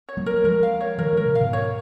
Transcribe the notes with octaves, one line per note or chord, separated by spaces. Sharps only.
C#5
F#3 A#3
A#4
F3 G#3 A#4
F5
C#5
D#3 F#3 A#4
F3 G#3 A#4
A#2 C#3
G#2 B2 F5
C#5